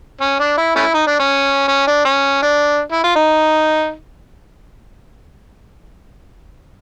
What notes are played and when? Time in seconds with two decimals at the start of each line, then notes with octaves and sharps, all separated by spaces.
0.21 C#4
0.40 D4
0.57 E4
0.76 A3 C#4 E4
0.94 D#4
1.07 D4
1.19 C#4
1.68 C#4
1.87 D4
2.05 C#4
2.42 D4
2.92 E4
3.04 F4
3.16 D#4